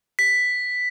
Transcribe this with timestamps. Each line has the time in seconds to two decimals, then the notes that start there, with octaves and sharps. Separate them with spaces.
0.19 B6